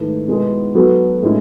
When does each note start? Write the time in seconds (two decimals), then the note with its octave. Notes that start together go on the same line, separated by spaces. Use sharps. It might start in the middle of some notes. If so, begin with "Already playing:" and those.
Already playing: G#2 D#3 A3 E4 B4
0.28 B2 G#3 B3 E4 G#4
0.74 F#3 B3 F#4 A4
1.22 A2 G#3 C#4 E4